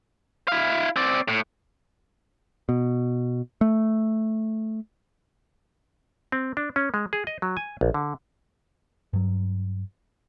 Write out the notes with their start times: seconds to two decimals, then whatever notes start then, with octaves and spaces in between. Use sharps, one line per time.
0.48 E4 F5
0.96 C4 D5
1.28 A2
2.69 B2
3.61 A3
6.32 C4
6.57 D4
6.76 C#4
6.94 G#3
7.13 G#4
7.27 D#5
7.42 F#3
7.57 G#5
7.81 A#1
7.94 D3
9.13 G2 F#3